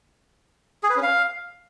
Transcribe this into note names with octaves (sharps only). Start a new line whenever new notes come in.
G#4
B4
C#4
F5